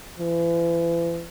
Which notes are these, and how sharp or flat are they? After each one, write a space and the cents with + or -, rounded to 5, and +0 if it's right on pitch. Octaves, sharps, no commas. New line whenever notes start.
E3 +40